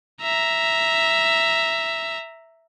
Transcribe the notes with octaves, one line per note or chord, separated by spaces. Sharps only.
E5 A#5